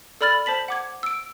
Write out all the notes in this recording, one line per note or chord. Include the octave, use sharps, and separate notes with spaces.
A4 D5 B5 F6 A6
C5 A5 B6 F#7
F#5 D6 G#6
E6 D7